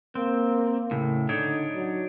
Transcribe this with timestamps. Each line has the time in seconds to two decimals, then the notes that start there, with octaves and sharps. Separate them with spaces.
0.15 A#3 C4
0.91 A2 C#3
1.29 D3 D4 D#4 C#5
1.75 F#3